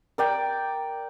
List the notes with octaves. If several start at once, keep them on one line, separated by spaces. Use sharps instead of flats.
A#4 D5 G5